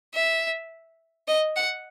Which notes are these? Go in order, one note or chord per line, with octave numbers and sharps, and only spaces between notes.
E5
D#5
F#5